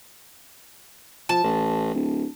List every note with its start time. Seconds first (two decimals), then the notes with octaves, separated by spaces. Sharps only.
1.29 F3 A5
1.44 A1
1.94 D1